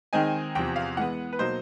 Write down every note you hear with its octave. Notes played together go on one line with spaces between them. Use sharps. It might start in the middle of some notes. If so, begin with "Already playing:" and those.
D#3 G#3 C4 D#4 G#5
E2 C3 F3 G5
F5
E3 G#3 B3 F#5
B4
B2 F#3 A#3 D#4 C5